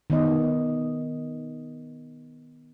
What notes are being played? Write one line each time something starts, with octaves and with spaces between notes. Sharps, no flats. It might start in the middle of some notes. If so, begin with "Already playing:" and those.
D#3 B3 D#5